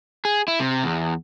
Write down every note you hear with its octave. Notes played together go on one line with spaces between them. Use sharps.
G#4
E4
C3
E2